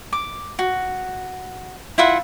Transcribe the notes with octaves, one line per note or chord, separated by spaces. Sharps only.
D6
F#4
E4 F4 E5 F#5